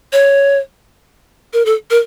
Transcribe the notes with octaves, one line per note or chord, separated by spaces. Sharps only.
C#5
A#4
A4
A#4